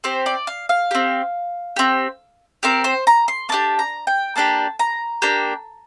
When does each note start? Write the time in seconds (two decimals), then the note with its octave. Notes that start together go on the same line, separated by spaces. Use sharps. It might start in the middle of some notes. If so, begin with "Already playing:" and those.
0.04 C4 G4 C5
0.26 D5
0.47 F5
0.69 F5
0.91 C4 G4
1.76 C4 G4
2.63 C4 G4 A#4
2.84 C5
3.07 A#5
3.28 C6
3.49 A#3 D4 G4 A5
3.79 A#5
4.07 G5
4.36 A#3 D4 G4 A5
4.79 A#5
5.22 A#3 D4 G4